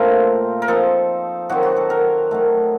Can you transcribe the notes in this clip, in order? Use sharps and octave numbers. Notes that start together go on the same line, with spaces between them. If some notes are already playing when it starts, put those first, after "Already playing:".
Already playing: A#2 A3 C4 A#4 C5
A#4
F3 C4 D#4 A4
D#3 F#3 C4 F#4
F#4
A4
A#4
D#3 F#3 A3